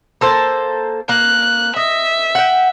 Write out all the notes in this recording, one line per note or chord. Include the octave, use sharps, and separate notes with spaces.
A#3 A4 C5
A#3 F#6
D#5 E5
F#5 G5